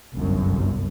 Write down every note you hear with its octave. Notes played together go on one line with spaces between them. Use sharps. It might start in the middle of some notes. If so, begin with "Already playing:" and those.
G1 C2 F#2